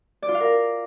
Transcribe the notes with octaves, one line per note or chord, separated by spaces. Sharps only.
D5
F4
F5
A#4